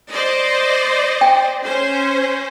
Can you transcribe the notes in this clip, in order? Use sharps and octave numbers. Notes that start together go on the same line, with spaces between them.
C5 D5 D#5
G5
C#4 C5